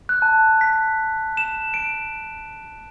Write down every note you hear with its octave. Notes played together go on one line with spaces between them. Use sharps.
F#6
A5
B6
E7
D7